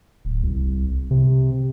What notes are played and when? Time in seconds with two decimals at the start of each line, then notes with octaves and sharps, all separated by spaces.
0.25 D1
0.43 C2
1.11 C3